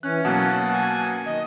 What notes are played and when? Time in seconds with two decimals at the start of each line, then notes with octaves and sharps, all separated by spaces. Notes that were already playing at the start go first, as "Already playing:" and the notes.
0.03 E3 C#4 F#6
0.25 B2 F#3 A#3 F#5 A5
0.73 G#5
1.26 D#3 D#5